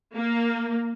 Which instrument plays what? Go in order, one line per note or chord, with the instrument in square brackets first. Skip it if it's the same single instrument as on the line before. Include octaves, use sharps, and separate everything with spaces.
[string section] A#3